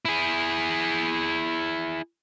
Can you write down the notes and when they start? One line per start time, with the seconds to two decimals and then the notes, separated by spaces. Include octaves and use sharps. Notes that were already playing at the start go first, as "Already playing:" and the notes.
0.05 E4 G#4